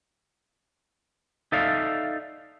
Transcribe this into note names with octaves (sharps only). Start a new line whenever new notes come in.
D#4 A4 D5 E5 F5